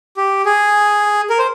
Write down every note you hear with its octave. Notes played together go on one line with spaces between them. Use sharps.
G4
G#4
A#4
C5